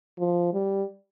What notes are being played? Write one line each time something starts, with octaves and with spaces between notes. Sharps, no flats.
F3
G3